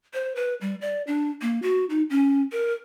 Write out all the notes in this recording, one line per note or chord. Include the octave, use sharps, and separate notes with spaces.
C5
B4
G3
D5
D4
A#3
F#4
D#4
C#4
A#4